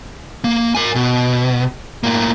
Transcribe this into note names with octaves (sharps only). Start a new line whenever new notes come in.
A#3
A#4 G#5
B2
A2 A#3